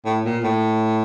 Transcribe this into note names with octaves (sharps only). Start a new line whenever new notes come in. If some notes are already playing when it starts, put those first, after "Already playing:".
A2
A#2
A2